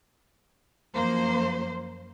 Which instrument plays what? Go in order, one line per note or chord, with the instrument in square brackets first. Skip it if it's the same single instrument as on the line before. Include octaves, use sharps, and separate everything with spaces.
[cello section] F#2 F3 A#3 C5